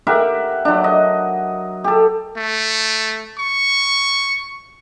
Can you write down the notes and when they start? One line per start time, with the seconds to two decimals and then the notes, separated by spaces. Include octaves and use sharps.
0.07 G4 A#4 E5 F#5
0.65 F#3 D4
0.84 D#5
1.84 G4 A4
2.37 A3
3.38 C#6